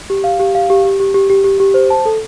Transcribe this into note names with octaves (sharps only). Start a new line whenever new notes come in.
G4
F5
G4
F5
G4
G4
G4
G4
G4
G4
G4
C5
A5
A4